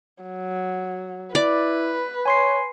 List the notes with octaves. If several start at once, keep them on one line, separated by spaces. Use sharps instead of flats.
F#3
E4 B4 D5
C#5 G#5 C6 C7